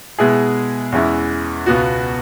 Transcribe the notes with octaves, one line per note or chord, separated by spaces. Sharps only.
B2 G#3 E4 G#4
E2 E3 G#3 C#4 E4
C#2 B2 B3 F#4